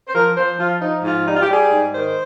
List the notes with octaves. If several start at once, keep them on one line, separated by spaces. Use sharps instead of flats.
C5
F3 A#4
F3 C5
F3 F4
F3 D#4
G#2 F4
G3 D#4
F4
G4
G3 G#4
G#2
D#3 C5